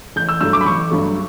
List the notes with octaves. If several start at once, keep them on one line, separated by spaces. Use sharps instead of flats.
A1 G6
E6
G2 F#3 A3 E6
D6
B5
A1 C#6
G2 F#3 A3